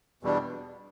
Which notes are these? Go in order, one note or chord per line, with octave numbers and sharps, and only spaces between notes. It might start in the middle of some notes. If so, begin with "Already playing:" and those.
E2 B2 G3 D4